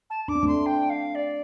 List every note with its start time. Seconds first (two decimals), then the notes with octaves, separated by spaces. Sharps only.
0.10 A5
0.28 D4 D6
0.35 C4
0.43 A3 D4 C6
0.66 G5
0.90 F5
1.15 D5